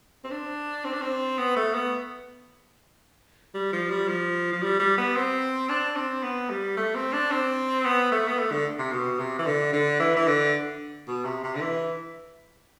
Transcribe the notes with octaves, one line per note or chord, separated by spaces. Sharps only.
C4
D4
C4
D4
C4
B3
A3
B3
G3
F3
G3
F3
F3
G3
G3
B3
C4
D4
C4
B3
G3
A3
C4
D4
C4
B3
A3
B3
A3
D3
C3
B2
C3
E3
D3
D3
E3
E3
D3
B2
C3
C3
D3
E3